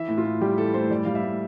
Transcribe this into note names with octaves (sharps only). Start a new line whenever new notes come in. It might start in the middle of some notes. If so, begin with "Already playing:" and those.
Already playing: E3 E5
A2
F4
A2
G3 G4
E3 A4
A2 C5
G3 D5
G3 F5
E5
A2